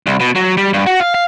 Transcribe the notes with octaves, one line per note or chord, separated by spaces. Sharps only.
C2
B2
F#3
G3
G2
F#4
F5
F5